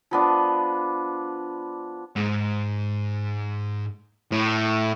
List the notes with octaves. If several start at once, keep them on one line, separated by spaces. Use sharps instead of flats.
F3 B3 D4
G#2
A2